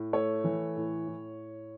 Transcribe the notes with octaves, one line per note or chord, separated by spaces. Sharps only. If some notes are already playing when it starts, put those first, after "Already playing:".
Already playing: A2
A3 C#5
E3
A2
A2